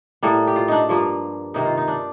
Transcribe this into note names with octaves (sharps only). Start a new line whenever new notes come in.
A2 G3 A#3 A4
G4
F4
D4 D#4
G2 F3 A#3
C3 D#3 A#3 D#4
F4
D#4
D4